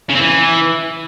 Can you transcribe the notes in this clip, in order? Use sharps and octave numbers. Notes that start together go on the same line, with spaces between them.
C#3
C4
E3